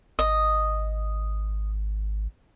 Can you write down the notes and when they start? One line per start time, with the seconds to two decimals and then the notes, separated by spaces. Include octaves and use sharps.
0.19 G#1 D#5